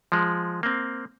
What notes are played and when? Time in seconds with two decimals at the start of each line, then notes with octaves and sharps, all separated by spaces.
0.12 F3 G#3
0.63 A#3 C4